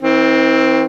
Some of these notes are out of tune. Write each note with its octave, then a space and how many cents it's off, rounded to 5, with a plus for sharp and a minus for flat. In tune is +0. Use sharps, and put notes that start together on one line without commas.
E3 -45 C4 +10